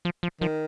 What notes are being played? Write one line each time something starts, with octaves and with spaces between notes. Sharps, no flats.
F3
F3
D#3 F3